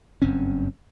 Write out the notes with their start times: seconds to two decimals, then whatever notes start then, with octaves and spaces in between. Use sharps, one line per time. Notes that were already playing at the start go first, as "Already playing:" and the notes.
0.22 F#1 G2 C4 C#4